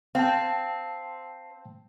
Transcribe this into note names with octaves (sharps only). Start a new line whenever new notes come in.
C4 F5 G5 A5